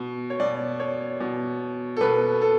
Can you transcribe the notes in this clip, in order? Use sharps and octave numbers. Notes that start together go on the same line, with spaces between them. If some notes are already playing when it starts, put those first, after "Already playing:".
Already playing: B2
C#5
B2 D5
C#5
B2
A4
B2 B4
A4